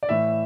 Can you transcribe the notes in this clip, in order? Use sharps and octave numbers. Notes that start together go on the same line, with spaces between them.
D5
A2 E3 E5